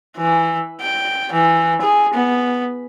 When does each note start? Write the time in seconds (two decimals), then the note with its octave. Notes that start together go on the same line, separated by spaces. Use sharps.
0.17 E3
0.81 G5
1.33 E3
1.82 G#4
2.14 B3